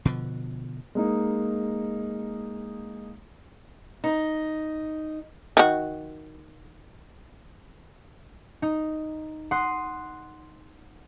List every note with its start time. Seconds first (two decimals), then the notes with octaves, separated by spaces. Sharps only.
0.05 B2 D3 F3
0.95 G#3 A#3 D#4
4.04 D#4
5.57 D#3 F#4
8.62 D#4
9.51 F#5 C6 D#6